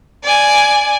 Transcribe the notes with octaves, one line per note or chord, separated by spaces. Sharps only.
D5 G#5